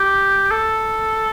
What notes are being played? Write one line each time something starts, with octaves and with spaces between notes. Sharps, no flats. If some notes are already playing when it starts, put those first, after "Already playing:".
Already playing: G4
A4